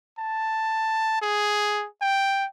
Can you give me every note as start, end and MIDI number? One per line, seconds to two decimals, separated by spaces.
0.19 1.21 81
1.22 1.87 68
2.02 2.46 79